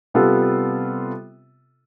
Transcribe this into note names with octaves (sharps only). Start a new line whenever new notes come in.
C3 G3 B3 F4 A4